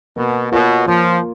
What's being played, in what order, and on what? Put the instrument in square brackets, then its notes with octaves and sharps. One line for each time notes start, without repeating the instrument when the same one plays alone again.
[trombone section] B2 [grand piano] A#3
[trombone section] B2 [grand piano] F4 A#4 C#5
[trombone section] F3 [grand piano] A#3